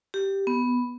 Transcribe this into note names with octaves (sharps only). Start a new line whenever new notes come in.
G4
B3